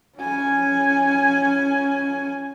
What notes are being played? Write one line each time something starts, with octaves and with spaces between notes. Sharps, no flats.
C#4 G#5